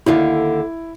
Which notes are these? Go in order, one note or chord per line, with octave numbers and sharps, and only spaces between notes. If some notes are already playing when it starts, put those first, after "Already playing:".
D#2 D3 E4 F4